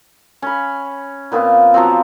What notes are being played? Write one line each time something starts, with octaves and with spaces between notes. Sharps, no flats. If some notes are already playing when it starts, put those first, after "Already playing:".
C#4 B5
A#2 B3 C4 F4
F3 F#3 B3 C4